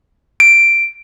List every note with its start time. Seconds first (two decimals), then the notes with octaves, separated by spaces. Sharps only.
0.40 D7